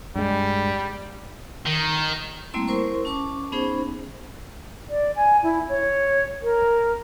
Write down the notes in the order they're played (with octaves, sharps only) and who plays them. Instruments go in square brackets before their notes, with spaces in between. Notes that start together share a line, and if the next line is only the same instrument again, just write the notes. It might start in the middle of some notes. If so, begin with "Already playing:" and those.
[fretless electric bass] G2 G#3 [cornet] G3
[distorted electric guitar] D#3
[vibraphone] G3 A3 A#3 C4 E4 C6
E4 A#4 C5 C6 C#6
C#4 A5 C#6 D6
B3 C#4 D#4 G#4 C5
[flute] D5
G#5
E4
C#5
A#4